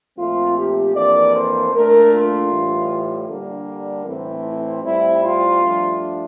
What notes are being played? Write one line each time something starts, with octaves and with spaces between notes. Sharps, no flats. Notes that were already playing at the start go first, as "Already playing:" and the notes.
A#2 F3 A3 C4 F4
G4
F2 E3 A#3 D4 D5
C5
A#2 A3 D4 A#4
F4
A2 E3 G3
D3 G3 A#3 D4
A2 E3 A3 C4
E4
A2 G3 C4 E4
F4
G2 F3 A3 D4